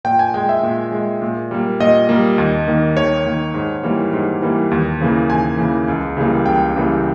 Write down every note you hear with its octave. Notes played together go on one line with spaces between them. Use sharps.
A#2 G5
G#5
G#3 G5
E5
A#2
G#3
A#2
G3 A#3
A#2 D#5
G3 A#3
D#2
D#3 A#3
D#2 C#5
D#3 A#3
G#2
E3 G3 A#3
G#2
E3 G3 A#3
D#2
C#3 E3 A#3
D#2 G#5
C#3 E3 A#3
C#2
C#3 E3 G3 A#3
C#2 G5
C#3 E3 G3 A#3